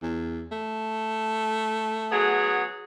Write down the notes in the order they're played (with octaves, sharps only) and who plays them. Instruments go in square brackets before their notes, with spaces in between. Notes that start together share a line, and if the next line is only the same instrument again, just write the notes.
[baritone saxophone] E2
A3
[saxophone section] F#3 B3 G#4